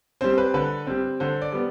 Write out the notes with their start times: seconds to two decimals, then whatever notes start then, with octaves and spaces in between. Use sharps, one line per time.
0.21 G3 C4 C5
0.38 B4
0.54 D3 B4
0.87 G3 C4
1.20 D3 C5
1.42 D5
1.52 G3 B3